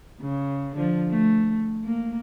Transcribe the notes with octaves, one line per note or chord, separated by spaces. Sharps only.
C#3
D3 F3
A3
A#3